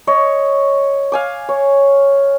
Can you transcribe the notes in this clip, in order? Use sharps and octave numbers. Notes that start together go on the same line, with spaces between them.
C#5 D#5
F5 G#5 D6
C#5